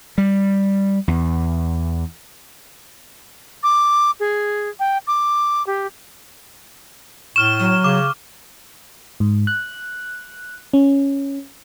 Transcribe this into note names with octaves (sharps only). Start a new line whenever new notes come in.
G3
E2
D6
G#4
G5
D6
G4
A2 C#6 F6 E7 G7
F#3
C#3 D6
G#2
F#6
C#4